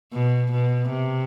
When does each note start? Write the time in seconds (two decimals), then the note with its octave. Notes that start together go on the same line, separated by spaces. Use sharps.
0.13 B2
0.51 B2
0.89 C3